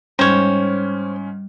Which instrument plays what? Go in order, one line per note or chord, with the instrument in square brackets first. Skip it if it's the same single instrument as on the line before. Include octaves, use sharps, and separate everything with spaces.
[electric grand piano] G#2 C#4 [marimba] G3 [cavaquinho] C5 C#5